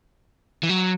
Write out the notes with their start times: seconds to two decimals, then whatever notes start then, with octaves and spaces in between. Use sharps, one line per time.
0.63 E3
0.69 F#3